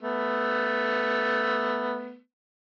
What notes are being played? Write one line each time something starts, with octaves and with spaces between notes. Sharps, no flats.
A3 B3